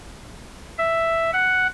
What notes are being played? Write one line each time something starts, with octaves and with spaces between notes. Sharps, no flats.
E5
F#5